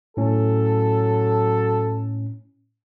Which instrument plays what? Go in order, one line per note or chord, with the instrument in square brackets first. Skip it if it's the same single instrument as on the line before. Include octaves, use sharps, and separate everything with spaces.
[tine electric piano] A2 C#4 [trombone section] F#3 A4